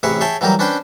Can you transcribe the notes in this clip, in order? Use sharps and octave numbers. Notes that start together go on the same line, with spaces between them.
A1 C3 G#4 B4 C#5 E5
G#4 C#5 E5 G5 A5
E3 F#3 G3 G4 A#4
C#4 D4 B4 C5 G5